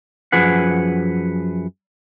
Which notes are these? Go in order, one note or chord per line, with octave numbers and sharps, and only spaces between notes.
F#2 F3 G#4 B4 F#5